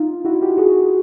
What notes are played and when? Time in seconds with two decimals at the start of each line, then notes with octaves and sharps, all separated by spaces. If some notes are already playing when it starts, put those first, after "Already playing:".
Already playing: D#4 F4
0.25 E4 F#4
0.41 F4 G4
0.58 F#4 G#4